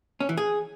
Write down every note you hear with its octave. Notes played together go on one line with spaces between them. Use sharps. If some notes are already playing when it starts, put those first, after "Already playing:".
C#4
E3
G#4